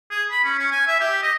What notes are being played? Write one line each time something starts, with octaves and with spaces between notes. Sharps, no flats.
G#4
B5
C#4
C#4
G#5
E5
G4
D#5